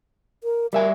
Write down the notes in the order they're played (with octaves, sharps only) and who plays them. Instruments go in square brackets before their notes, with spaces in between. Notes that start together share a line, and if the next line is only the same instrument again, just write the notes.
[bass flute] A#4
[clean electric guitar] G3 E5 G#5 [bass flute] A#4